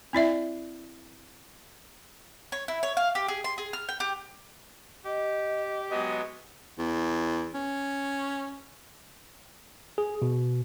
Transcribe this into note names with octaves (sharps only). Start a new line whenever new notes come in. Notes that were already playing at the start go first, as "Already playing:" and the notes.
C4 E4 D5 E5
C#5
E4
C#5
F5
G4
G#4
C6
G#4
F6
G5
G4
G4 D#5
F#3 G#3 B3 D#5
E2
C#4
G#4
B2